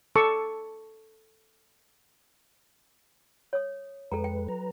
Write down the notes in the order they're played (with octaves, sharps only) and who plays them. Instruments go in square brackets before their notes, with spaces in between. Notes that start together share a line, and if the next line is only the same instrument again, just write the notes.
[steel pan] A4 A5 C#6 D6 E6
[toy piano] C#5 D#6
[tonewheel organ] F2 G#3 B4 [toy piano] A4 G5 A#5
[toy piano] G5
[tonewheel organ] F#3 B4 A#5